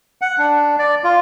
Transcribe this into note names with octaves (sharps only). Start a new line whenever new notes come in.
F#5
D4
D5
F4